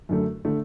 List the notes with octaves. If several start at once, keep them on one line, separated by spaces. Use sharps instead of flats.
F#2 D3 A3
D3 A3